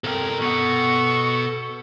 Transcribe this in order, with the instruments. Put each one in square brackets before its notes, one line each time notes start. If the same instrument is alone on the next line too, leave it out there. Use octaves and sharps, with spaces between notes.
[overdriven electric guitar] C3 A#4 [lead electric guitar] A4 G5
[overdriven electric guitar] B2 B3 [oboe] C#6